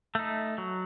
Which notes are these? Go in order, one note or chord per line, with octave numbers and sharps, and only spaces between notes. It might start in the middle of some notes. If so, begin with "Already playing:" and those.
A3 D#4
F#3